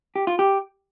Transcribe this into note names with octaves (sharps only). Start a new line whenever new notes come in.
G4
F4
G4